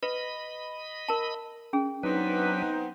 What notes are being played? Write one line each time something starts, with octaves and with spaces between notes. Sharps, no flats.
B4 D#5 B5
A#4 A5
C#4 G#4
F#3 B3 C4 D4 D#4 B4